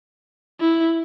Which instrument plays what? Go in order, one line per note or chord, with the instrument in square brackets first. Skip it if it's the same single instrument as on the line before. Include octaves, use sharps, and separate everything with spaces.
[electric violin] E4